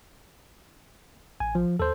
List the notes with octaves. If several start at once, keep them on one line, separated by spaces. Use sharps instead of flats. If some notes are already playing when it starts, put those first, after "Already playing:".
A1 G#5
F3
D#2 A4 C5